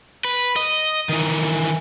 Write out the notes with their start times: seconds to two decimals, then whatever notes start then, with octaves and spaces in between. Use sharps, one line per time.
0.25 B4
0.56 D#5
1.09 D#3 E3